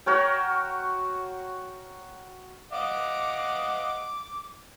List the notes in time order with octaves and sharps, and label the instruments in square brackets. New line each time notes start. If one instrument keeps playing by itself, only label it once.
[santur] F#4 A#4 C#5 G5
[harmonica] D#5 F5 F#5 [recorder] D6